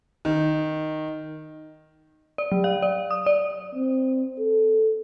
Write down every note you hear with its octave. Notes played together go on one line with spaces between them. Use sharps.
D#3
D5
F#3
F5
D5
D#6
D5
C4
A4